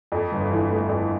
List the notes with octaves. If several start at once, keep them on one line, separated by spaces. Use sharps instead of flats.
F2
G1
E3
A3
F2